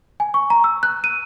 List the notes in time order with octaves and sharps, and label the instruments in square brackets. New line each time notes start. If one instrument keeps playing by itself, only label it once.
[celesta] G#5
C#6
A#5
E6
F#6
D#7